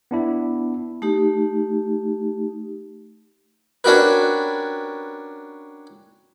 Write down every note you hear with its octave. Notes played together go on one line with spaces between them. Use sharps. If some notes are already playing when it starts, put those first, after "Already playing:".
B3 D4 E4
A3 D#4 G4
C#4 D4 F#4 G4 A#4 B4